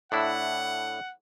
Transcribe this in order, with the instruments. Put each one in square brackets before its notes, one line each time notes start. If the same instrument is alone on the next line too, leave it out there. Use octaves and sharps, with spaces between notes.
[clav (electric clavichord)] A2 D4 E4 [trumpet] F#5